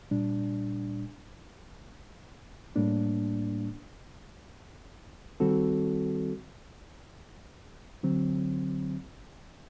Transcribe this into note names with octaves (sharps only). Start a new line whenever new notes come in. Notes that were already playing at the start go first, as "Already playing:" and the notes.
A#2 G3 D4
A2 G3 A#3 D4
D#3 G3 C4 F#4 A4
D3 F#3 C4